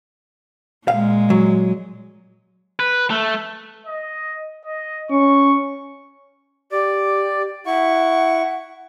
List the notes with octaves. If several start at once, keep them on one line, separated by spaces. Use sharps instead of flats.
A#2 G#3 F5
F#3
B4
A3
D#5
D#5
C#4 C#6
G4 D5
E4 F#5 C#6